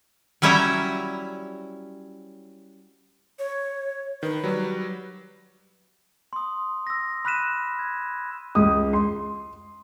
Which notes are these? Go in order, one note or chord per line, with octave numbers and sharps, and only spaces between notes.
F#3 G3 C#4 E4 E5 A#5
C#5
D#3 B4
F#3 G3
C6 D#6
E6 A#6
B5 F6 F#6 B6 D#7 E7
G#6
C#2 D#6
C6